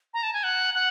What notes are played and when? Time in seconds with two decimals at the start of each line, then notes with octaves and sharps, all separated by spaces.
0.14 A#5
0.23 A5
0.33 G#5
0.43 F#5
0.74 F#5